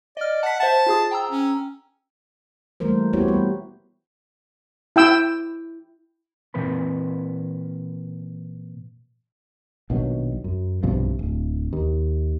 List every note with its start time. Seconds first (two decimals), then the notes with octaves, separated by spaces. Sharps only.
0.17 D5 D#5 F6
0.43 F#5 A5 B6
0.60 C5 E5 F#5 A5
0.86 F4 G#4 D#6
1.11 G5 A#5 E6
1.31 C#4
2.80 E3 G3 A3 A#3 A#4 C5
3.13 B3 E4 F#4 G4 C5 C#5
3.28 G3 B3 B4
4.96 E4 G5 E6
6.54 A#2 E3 C4 A#4 B4 B5
9.90 A#1 B2 D#3 F#3
10.44 F#2
10.83 B1 G2 C3 F3
11.19 D1
11.73 D#2